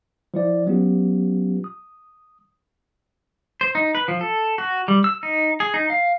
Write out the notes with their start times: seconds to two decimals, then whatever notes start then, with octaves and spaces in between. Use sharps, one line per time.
0.34 F3 E4 D5
0.67 F#3 B3 C#4 F4 G4
1.64 D#6
3.61 C5
3.75 D#4
3.95 B4
4.08 F3
4.21 A4
4.58 F#4
4.88 G3
5.04 E6
5.23 D#4
5.60 G#4
5.74 D#4
5.90 F5